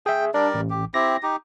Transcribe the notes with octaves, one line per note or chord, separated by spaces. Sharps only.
G#4 E5 G5
G3 D4 A#4 D5
A1
G4
C4 E4 G4 A#6
D#4 G4